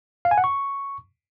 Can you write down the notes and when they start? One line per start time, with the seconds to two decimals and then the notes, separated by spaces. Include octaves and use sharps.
0.25 F5
0.31 G#5
0.38 F#5
0.44 C#6